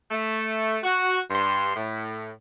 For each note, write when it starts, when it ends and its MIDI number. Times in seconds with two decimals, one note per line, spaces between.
0.11 0.77 57
0.83 1.19 66
1.31 1.75 43
1.31 1.75 84
1.76 2.31 45